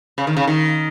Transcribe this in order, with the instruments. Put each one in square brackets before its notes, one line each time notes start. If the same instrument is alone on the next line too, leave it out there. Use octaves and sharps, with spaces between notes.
[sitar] C#3
D#3
C#3
D#3